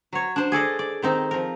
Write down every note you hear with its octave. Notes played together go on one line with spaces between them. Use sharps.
F#3 C#5
D4 C5
G#4 A4 D5 D#5
D5
D#3 C4 D#4
F3 A#4